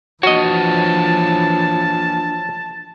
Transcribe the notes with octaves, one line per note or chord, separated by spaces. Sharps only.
E3 F3 A#3 D4 F#4 C#5 D#5 A5